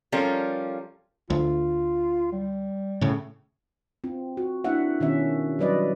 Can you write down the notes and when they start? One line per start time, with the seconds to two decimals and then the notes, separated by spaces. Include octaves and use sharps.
0.12 F3 G3 C#4 F4 A4 A#4
1.30 D2 F4
2.32 G3
3.01 A2 C#3
4.04 C4 F4
4.37 F#4
4.64 A#3 D4 E4 E5 F#5
5.00 B2 D#3 C#4 E5
5.59 F#3 G3 B4 D5 D#5